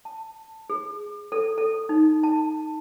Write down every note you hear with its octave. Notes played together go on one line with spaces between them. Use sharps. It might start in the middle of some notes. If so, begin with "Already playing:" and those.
A5
G#4
A4
A4
D#4
A5